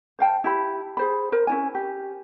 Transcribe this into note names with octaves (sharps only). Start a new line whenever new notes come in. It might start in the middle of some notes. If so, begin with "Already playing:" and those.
C5 F5 G5 A5
E4 G4 B5
G#4 C5 B5
A#4 C5
C#4 E4 G#5
G4